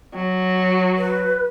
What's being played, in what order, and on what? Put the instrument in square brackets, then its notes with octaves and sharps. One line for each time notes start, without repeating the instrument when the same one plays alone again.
[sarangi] F#3
[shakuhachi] B4